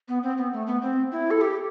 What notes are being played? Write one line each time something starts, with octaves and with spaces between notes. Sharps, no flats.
B3
C4
B3
A3
B3
C4
E4
A4
G4